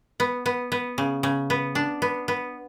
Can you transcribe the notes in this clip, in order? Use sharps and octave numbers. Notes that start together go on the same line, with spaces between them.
B3
B3
B3
C#3
C#3
B3
D4
B3
B3